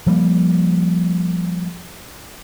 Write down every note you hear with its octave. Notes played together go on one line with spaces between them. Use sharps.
F3 G3 A#3